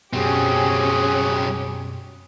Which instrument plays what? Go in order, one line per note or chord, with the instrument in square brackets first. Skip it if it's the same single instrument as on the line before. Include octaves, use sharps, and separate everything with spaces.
[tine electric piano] F#2 B2 [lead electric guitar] F#3 C4 [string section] C#4 G4 [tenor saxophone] G#4